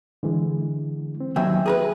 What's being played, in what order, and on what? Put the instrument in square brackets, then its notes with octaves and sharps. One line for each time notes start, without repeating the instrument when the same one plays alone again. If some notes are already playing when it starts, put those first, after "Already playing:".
[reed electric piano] D3 E3 G#3
C4
[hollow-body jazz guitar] D#2 F#3 [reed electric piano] E5 G5 G#5
[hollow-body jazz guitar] G#4 A#4 B4